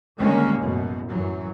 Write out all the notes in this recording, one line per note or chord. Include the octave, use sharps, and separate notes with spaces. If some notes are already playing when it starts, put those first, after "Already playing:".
D3 D#3 G3 G#3 A#3 C#4
A1 F#2 B2
F#2 E3 F#3